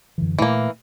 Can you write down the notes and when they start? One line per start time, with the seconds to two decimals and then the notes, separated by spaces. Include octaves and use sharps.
0.18 F#2 D3 E3
0.39 A#2 E3 A3 A#3